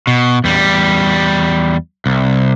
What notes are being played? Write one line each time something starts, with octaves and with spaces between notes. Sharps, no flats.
B2
E2 G3
C2